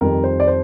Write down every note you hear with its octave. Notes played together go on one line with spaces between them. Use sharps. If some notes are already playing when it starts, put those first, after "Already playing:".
F2 D#3 G3 A#4
C5
D5
C5